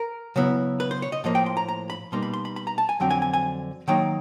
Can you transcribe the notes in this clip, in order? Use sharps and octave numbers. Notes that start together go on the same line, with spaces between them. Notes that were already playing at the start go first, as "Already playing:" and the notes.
Already playing: A#4
C#3 F#3 B3 E4
B4
C5
C#5
D#5
A2 F3 A#3 D#5
G5
C6
A#5
A#5
B5
B2 G3 A#3 D#4 C6
B5
C6
B5
B5
A#5
A5
G#5
F2 D3 F#3 C4 G5
G#5
G#5
G#5
D#3 F#3 A#3 D#4 G5